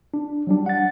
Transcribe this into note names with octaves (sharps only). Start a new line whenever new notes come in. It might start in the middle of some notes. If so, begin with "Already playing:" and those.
D4
F#3 G3 D4
F#5 A6